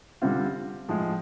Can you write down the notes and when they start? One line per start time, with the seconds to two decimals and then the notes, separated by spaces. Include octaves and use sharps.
0.22 D3 G3 C4 F4
0.88 A2 F3 G#3